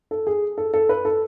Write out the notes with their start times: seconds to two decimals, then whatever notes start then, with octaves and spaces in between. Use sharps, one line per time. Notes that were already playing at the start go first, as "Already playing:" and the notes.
0.11 A4
0.27 G#4
0.58 A4
0.74 A4
0.89 B4
1.05 A4